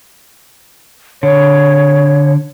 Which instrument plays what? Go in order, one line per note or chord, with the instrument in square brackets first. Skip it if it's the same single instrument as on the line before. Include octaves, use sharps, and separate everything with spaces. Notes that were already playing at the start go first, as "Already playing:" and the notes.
[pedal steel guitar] D3 [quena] C#5